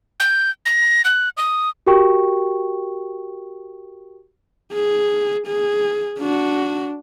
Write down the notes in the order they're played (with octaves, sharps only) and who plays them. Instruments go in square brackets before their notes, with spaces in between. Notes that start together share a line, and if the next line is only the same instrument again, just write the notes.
[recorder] G6
A#6
F#6
D#6
[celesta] F#4 G4 A#4 G5 C#6
[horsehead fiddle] G#4
G#4
D4 F#4